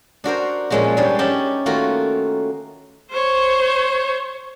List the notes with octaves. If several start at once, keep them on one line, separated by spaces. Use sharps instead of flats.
D4 F#4 A#4 C5
A#2 F3 G#3 C#4 F#4
G#2 G3 G#3 D4 D#4 C#5
C#4 G4 D#5 F#5 A5
D#3 A3 A#3 F4 F#4
C5 C#5